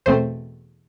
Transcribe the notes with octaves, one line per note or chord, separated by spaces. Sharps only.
E2 B2 A3 C4 C5